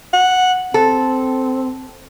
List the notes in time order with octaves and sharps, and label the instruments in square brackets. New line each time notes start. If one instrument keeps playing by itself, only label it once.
[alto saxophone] F#5
[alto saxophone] C4 [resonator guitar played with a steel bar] A4